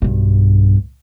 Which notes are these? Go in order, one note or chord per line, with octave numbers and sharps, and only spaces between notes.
B1 G2